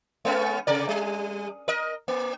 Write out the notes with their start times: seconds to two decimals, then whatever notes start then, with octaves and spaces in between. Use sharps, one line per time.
0.25 G#3 B3 C#4
0.67 C3 A#4 D5
0.89 G3
1.68 A#4 D#5
2.08 A#3